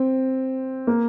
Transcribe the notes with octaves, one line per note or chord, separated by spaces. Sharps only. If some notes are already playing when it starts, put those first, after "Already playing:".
Already playing: C4
A#3